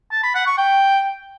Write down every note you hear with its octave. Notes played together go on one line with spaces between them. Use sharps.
A5
B5
F#5
C#6
G5